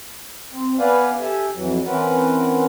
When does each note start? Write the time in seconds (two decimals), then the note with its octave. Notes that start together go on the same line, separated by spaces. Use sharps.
0.52 C4
0.79 B3 B4 D5 F5 F#5 G#5
1.21 G4 A4 E5 G#5
1.55 F2 E3 F#3
1.85 E3 C4 C#4 A#4 B4 F#5